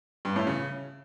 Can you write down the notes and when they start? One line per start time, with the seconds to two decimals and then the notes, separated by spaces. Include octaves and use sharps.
0.25 G2
0.36 A2
0.47 C#3